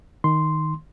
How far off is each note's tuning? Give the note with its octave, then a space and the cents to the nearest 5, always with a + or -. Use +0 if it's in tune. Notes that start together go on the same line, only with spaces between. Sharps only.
D#3 +0 C6 -5